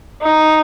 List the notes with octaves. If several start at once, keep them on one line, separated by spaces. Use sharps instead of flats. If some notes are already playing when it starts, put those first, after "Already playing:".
D#4